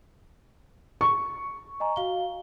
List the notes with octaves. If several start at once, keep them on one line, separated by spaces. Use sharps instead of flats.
C#6
D#5 G#5 A#5
F#4 F5 G7